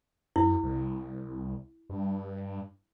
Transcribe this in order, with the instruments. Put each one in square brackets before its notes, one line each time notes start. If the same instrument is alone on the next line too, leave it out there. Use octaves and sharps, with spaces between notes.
[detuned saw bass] F#2 [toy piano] E4
[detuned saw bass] C2
G2